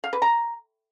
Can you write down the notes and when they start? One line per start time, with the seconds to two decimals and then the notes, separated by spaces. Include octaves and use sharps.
0.04 F5
0.13 B4
0.22 A#5